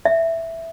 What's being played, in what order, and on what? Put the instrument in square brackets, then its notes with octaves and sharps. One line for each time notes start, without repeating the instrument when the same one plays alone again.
[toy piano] E5